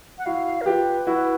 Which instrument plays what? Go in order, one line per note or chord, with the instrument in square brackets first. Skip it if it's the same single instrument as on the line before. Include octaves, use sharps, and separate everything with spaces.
[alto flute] F#5
[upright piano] E4 F#4 [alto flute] F5
[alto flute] A#4
[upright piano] F4 G4 [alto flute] B4
[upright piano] E4 F#4